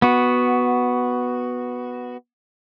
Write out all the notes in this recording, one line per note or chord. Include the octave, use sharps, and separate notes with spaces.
B3 F#4